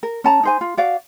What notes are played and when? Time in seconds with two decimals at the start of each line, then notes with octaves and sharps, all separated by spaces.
0.03 A#4
0.24 C#4 A5 A#5
0.43 D#4 C5 G#5
0.61 F4
0.77 F#4 D5 F5